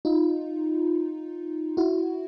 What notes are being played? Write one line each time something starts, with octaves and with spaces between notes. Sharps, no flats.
D#4 F4
E4 F#4